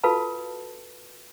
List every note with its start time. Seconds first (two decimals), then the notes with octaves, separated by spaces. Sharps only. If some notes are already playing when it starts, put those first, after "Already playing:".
0.04 F4 F#4 A4 B4 F5 A5